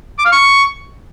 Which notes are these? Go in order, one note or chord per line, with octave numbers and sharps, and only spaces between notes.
D6
F5
C#6